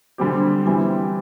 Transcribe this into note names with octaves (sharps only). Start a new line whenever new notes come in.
D3 G3 C4 G4
E3 G3 C4 G4